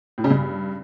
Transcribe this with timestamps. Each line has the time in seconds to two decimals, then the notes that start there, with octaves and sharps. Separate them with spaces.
0.18 A2
0.24 C#3
0.31 G2